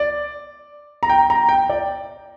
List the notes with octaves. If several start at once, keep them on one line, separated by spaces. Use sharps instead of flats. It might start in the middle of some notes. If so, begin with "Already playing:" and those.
Already playing: D5
A#5
G5
A#5
G5
D5